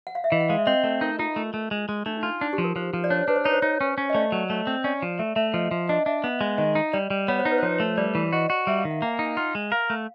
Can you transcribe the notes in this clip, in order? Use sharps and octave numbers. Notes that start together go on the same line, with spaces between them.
F#5
F5
E5
E3 D#5
F#5
G#3 F5
E5
C4 D#5
A3 A4
D#4 A#4
D#4 F4
A3 C#4
A3
G#3
G#3
A3 D4
D#4
D4 F4
D4 D#4
G4
F3
A#4
F3 C5
F3
D5
D4 C#5
C5
D4 B4
C5
D#4 C#5
C5
D#4 C#5
C#4
C#4
D#5
A3 D5
F#3
A3
C4
C#4 D5
F3
A3 E5
A3 E5
F3 D#5
F3
D4 D#5
D4 E5
B3
G#3
D#3 D#5
D#4
G3 D5
G3
B3 C#5
C5
D#4
B4
C5
F3 C#5
A3
G3 D5
E3
F#4 D#5
F#4
G3 E5
F5
D#3
F#5
A#3 G5
G#5
D#4
G#5
F4 F#5
G#3
A#4 F5
A3